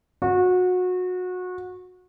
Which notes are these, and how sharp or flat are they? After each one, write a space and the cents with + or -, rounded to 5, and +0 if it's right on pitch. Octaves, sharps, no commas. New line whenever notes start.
F#4 -25